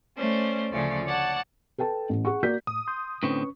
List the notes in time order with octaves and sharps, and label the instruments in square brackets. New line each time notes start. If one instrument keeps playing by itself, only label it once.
[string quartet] A3 C#4 C5 D5
D2 C#3 F3 A3 C#5 D5
C#5 D5 F#5 A5
[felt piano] A4 B4 G5 A5
A1
G#4 F#5 C#6
A#3 F#4 A#4 D5 G6 B6
[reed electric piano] A2 [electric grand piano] D#6
[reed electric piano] C6 G6
[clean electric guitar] A2 D3 C4 [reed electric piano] C#4 B4 C#6